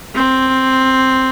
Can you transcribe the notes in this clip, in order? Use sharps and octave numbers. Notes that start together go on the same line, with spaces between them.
C4